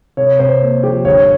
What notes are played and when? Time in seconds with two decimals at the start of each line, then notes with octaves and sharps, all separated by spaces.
0.17 C3 C#5
0.39 C3 C5
0.61 A#3
0.83 F3 G4
1.05 G1 C#5